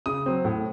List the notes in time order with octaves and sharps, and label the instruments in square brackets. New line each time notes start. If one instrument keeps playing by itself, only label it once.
[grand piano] C#3 D#6
F#3 C4
A2